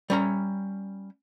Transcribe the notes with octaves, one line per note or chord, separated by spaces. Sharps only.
G3 C#4 A#5